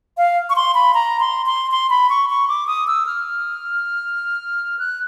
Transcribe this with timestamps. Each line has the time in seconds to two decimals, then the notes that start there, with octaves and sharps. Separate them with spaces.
0.17 F5
0.50 C#6
0.56 C6
0.75 B5
0.94 A#5
1.20 C6
1.46 C6
1.71 C6
1.90 B5
2.10 C#6
2.29 C#6
2.48 D6
2.67 D#6
2.87 E6
3.06 F6
4.79 F#6